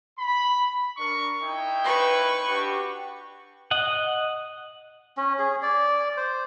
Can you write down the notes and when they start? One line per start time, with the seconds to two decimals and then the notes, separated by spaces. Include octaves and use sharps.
0.18 B5
0.98 D4 A#4 C#6
1.42 D#4 E4 G5
1.84 B4 C#6
2.49 D4 F#4 G4
3.71 D#5 F#5
5.17 C#4
5.39 G#4
5.63 D5
6.17 C5